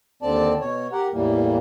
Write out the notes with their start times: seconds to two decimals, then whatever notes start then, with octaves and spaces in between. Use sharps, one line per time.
0.22 D#2 D3 C4 D5 A5
0.61 B2 C#5
0.92 G4 A#4 F#5
1.13 E2 A2 E3 G3 A#3